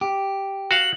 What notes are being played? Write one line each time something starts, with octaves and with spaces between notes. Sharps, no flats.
G4
F#4 F5 F#7